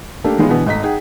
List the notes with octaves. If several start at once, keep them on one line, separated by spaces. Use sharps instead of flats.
A3 A#3 D4 G4 A4
D#3 E3 G#3 B3 C#4 F4
B2 D3 E3 B3
G#1 A3 D#5 A#5 B6
D#4 G#4 F#5 G5